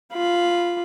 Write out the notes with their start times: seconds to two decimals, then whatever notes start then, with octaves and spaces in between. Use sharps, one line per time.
0.13 F4 B5